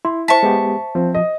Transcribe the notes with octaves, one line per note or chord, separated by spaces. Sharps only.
E4 C6
C5 E5 A5 C#6 B6
G#3 B3 G4
F3 C4
D#5